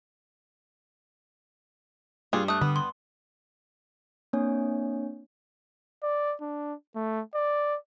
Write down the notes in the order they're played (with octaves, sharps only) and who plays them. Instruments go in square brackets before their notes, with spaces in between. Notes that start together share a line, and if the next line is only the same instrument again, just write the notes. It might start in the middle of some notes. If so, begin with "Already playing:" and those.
[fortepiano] G2 [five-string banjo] F4 G#4
[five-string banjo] A3 [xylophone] D#6 F#6
[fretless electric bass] D3 [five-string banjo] B3
[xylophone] C6
[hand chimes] A#3 C4 D4 C#5 G#5
[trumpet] D5
D4
A3
D5